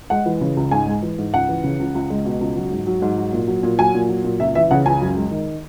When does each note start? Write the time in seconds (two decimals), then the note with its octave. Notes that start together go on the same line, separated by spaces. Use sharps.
0.10 G#3 F#5
0.26 E3
0.41 C#3
0.57 C#2
0.71 G#2 G#5
0.87 G#3
1.03 E3
1.18 G#2
1.34 C#2 F#5
1.49 E3
1.64 C#3
1.80 C#2
1.95 C#2
2.10 G#3
2.25 B2
2.41 C#2
2.56 F#3
2.71 G#2
2.87 F#3
3.02 G#2
3.17 F#3
3.33 A#2
3.48 F#3
3.63 A#2
3.78 F#3 G#5
3.95 A#2
4.09 F#3
4.24 A#2
4.40 C#2 E5
4.55 E3 E5
4.71 C#3 F#5
4.86 C#2 G#5
5.01 F#2
5.17 G#3
5.31 D#3